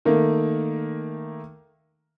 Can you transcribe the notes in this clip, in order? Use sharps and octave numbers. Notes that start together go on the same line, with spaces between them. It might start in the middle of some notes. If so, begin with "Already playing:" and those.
D#3 A3 A#3